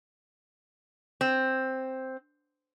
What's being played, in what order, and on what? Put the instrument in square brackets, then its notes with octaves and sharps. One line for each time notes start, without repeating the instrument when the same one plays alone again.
[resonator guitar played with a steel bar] C4